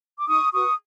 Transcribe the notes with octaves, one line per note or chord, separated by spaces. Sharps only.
D6
D#4 C#6 D#6
F#4 B4 C#6 D#6